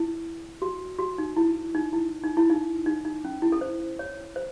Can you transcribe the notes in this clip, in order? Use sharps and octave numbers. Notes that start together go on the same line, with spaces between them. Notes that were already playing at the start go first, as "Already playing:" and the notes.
Already playing: E4
F#4
F#4
D#4
E4
D#4
E4
D#4
E4
D#4
D#4
D#4
C#4
E4
A4
C5
C#5
C5